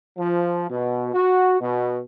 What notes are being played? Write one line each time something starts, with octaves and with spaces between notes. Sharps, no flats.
F3
B2
F#4
B2